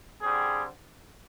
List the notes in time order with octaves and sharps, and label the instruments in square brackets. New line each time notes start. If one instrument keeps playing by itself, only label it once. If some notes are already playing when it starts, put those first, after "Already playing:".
[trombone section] D3 G3 C4 G#4